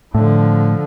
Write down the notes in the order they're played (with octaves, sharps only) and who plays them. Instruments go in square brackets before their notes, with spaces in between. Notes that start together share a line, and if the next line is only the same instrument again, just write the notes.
[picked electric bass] A2 [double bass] D3 F3